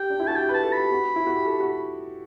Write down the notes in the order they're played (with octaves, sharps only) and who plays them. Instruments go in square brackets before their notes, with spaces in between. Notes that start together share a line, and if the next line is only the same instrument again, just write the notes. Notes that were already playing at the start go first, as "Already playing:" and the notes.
Already playing: [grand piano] G4 [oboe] G5
[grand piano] D4
E4
[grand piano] F#4 [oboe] A5
[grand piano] G4 [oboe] G5
[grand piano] B4
[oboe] A5
[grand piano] A4
[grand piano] G4 [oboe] B5
[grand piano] F#4
E4
F#4
G4
A4
F#4